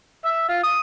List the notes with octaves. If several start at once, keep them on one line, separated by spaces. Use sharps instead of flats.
E5
F4
D#6